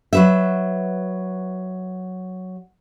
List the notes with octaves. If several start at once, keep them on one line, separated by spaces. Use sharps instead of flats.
F#3 B4 E5